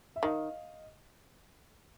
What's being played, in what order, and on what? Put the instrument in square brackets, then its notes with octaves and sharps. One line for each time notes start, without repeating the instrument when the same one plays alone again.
[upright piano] E5
[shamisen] D#3 [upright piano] D#5 F5